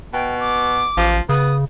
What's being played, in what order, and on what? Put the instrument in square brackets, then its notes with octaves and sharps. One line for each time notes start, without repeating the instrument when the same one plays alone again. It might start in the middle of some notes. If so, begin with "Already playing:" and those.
[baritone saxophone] B2 [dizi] G5
[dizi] D6
[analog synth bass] A1 [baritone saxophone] F3
[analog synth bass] C#3 [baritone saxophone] B3 [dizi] D#6